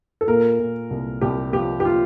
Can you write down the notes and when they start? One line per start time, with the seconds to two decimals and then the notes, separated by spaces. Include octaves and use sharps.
0.21 A4
0.28 A#2 A#4
0.59 A#2
0.91 C2
1.21 C2 G4
1.53 F3 G4
1.80 G4
1.85 F4